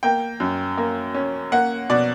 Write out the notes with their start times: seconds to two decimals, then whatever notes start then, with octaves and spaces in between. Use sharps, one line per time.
0.03 A#3 G5
0.40 F#2
0.78 A#3
1.14 C#4
1.52 A#3 F#5
1.90 B2 D5